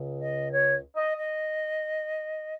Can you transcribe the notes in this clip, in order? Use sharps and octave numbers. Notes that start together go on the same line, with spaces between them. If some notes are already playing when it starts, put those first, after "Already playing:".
Already playing: C#2 C#3
D#5
C#5
D#5
D#5